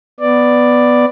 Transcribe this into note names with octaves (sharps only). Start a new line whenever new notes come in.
B3 D5